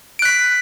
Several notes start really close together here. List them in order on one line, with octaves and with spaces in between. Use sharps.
D7 F#6 B6